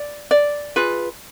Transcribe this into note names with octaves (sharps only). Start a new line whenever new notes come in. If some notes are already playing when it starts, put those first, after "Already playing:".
Already playing: D5
D5
F4 G#4 B4